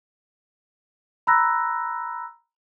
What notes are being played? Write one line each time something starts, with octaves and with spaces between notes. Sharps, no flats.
A#5 B5 E6 F#6 A#6